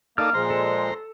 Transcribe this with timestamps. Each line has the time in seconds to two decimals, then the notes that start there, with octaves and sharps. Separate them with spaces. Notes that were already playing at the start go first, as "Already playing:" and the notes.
0.18 A#3 D#4 A4 D5 F6
0.34 A#2 F3 G#3 C5 A#5
0.50 A4